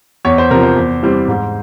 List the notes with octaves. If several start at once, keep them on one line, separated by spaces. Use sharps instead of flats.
E2 C#5
C5
C3 F3 A#4
C5
E2
E3 G3 C4
G#2